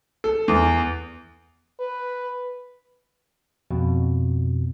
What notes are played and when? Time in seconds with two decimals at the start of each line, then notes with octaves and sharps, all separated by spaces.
0.24 A4
0.48 E2
1.80 B4
3.71 F2 B2